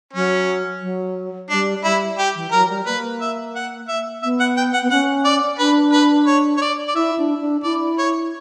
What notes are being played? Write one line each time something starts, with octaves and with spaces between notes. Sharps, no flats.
F#3 C#4
F#3
G3 D4
G3 E4
G4
E3
F#3 A#4
G3
A#3 B4
E5
F#5
E5
B3 E5
F#5
G5
F#5
B3
C#4 F#5
D5
D4 B4
B4
C#5
C#5
D5
D5
E4 E5
D4
D4
E4 D5
C#5